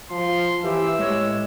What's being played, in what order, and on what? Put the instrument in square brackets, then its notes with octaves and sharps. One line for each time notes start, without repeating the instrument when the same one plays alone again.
[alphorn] F3 [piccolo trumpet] C6
[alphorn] E3 [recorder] G4 [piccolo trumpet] E6
[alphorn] A2 [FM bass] G#3 [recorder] C#5